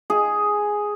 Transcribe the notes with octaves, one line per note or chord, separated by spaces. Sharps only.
G#4